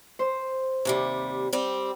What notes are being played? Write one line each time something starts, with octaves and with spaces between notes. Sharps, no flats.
C5
D#2 C3 G3
G3 C4